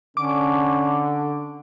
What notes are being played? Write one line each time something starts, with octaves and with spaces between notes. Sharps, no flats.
D3 C#4 D6